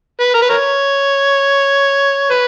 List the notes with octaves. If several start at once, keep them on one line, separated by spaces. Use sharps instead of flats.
B4
A#4
B4
A#4 C#5
B4